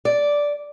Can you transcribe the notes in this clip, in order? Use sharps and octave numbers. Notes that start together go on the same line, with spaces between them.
D5